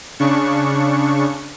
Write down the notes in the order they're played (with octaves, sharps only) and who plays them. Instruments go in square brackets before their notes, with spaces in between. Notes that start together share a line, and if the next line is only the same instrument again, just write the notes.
[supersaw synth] C#3 D4 C#6